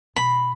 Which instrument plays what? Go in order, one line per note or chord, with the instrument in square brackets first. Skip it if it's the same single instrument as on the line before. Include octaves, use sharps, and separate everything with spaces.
[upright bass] B2 [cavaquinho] B5